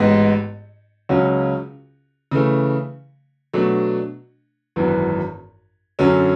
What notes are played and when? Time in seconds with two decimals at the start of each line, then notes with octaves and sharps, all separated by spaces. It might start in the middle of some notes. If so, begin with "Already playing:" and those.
Already playing: A1 G#2 G#3 B3
1.09 C#2 C#3 F#3 C#4 F#4
2.31 C#3 E3 A3
3.53 B2 F#3 A3 D4
4.76 G#1 F#2 E3 B3
5.99 F#2 D3 F#3 C#4